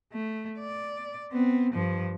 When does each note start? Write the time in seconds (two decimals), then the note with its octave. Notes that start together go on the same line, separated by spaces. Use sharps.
0.13 A3
0.59 D5
1.32 B3 C4
1.74 G2 F3